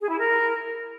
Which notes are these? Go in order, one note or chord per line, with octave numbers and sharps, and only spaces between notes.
G#4
E4
A#4